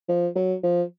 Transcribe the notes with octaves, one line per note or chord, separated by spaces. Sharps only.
F3
F#3
F3